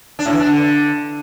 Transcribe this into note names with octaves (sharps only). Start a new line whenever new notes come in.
D4
A2
E3
D4
D3